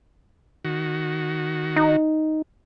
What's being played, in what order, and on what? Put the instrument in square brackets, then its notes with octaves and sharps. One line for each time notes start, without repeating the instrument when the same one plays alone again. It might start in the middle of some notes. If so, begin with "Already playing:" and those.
[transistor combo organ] D#3 F#4
[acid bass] D#4